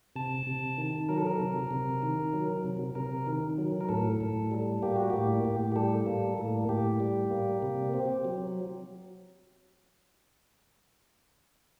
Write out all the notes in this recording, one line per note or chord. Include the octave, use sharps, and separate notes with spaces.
C3 A5
C3
D#3
F#3 A#4
A4
A#4
C3
C3
D#3
F#3
C3
C3 A#4
D#3
F#3
A#4
A2 A4
A2
G3
A#3 G4
F#4
A2 G4
A2
G4
G3 A4
A#3
A2
A2 G4
G3
A#3
C3
C4
F#3